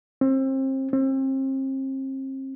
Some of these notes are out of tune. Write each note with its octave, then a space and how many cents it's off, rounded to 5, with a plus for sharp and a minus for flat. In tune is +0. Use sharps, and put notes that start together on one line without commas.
C4 +30
C4 +35